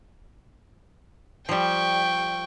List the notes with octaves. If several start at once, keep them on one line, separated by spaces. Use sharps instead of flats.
F3 G3 G5 C#6